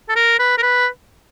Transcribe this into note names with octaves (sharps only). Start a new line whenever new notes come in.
A4
A#4
B4
A#4
B4